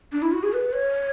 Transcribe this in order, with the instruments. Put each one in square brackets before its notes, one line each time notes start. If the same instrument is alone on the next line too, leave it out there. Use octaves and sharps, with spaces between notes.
[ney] D4
E4
F#4
G#4
B4
C#5